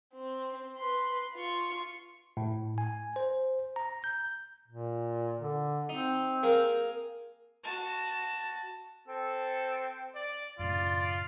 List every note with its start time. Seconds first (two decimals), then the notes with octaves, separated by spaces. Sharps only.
0.13 C4
0.77 B4 C6
1.35 F4 C#6
2.37 A2
2.78 G#5
3.16 C5
3.76 A#5
4.04 G6
4.68 A#2
5.40 D3
5.89 C4 D#4
6.43 A#3 G#4 A#4
7.64 F#4 A5
9.08 C4 A4
10.15 D5
10.59 F#2 A2 C#3 F4 D5